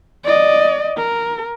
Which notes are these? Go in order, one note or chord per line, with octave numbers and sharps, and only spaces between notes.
D5 D#5
A#4